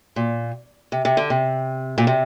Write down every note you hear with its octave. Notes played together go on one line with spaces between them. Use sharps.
A#2
C3
C3
D3
C3
A#2
C3